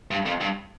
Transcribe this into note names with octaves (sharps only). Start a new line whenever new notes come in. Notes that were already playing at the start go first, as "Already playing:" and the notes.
G2
F2
G2